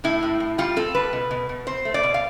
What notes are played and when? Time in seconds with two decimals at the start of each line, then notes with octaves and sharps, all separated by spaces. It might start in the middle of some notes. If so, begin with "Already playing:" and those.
0.04 A2 E4
0.23 A2
0.40 A2
0.58 G3 F4
0.76 C4 A4
0.95 G3 B4
1.13 B2
1.31 B2
1.49 B2
1.67 C4 C5
1.85 A3
1.94 D5
2.03 B2
2.14 F5